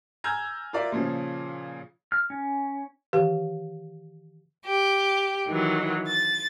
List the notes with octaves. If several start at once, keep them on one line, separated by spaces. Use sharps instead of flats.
G#5 A#5 E6 F6 G6 G#6
F4 A#4 D5 E5
A#2 C#3 F3 C#4
F6
C#4
D#3 E3 G4 B4 F5
G4
D#3 E3 F#3
A6